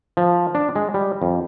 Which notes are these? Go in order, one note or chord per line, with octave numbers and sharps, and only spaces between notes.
F3
D4
G#3
G3
F2